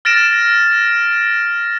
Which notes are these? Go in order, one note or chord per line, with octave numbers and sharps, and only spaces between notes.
F6 A6 A#6 D7 E7